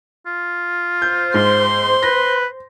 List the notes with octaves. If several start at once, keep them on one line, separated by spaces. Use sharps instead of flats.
F4
C5 G6
G#2 C6
B4 A#6